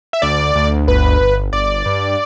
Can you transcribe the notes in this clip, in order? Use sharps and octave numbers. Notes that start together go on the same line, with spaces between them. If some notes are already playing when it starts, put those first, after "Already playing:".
E5
D2 D5
D2
G1 B4
G1
G1 D5
G2